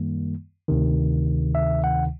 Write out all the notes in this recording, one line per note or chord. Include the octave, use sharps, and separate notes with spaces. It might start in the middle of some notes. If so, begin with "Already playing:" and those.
Already playing: F#2 D#3 G3 A#3
D2 C3 D#3
E5
F#5